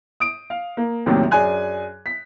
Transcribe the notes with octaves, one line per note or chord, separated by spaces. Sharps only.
D#6 D7
F5
A#3
A#1 D#2 A2 C3 D#3 F#3
F#2 D4 G#4 G#5 F#6
B6